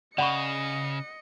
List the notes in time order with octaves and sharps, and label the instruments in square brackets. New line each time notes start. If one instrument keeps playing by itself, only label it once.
[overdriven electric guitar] C#3 [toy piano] D5 B5 C#6 [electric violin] D#5 C#7 [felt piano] F#5